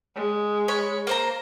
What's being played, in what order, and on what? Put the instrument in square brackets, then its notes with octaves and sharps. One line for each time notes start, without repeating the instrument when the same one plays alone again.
[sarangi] G#3
[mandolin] C#5 B5
A#3 C5 A#5